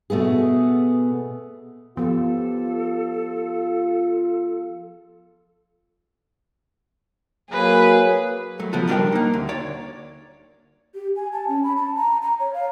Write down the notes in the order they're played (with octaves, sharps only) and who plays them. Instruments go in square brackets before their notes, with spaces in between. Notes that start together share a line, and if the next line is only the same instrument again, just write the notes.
[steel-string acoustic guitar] B2 A3 B3 G#4
[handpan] F3 G4 [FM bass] B3 [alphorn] F4 [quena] A4
[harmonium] F#3 A#3 [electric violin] G#4 B4
[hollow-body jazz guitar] F#3 A3
C#3 F3 B3 F#4 A4
G3 D4 A#4 D#5 F5 G5
A#3 D#4
D2
C#5 D5
[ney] G4
G#5
A5
C#4
B5
A5
A#5
A#5
C#5
F5